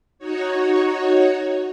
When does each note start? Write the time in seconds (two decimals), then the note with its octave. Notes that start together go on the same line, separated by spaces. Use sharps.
0.18 D#4 F#4 C#5